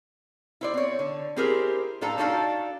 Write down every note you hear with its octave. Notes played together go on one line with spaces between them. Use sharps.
E4 C5 D5
C4 C#5
D3
C4 E4 G4 G#4 A#4 C5
A2 D4 F4 A4 F5 A#5
D4 D#4 F#4 A4 D5 F5